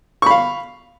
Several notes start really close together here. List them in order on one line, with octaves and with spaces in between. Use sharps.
C#6 B5 F5